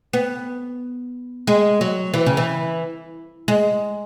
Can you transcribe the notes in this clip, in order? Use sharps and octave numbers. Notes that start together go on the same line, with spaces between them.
B3
G#3
F#3
E3
C#3
E3
G#3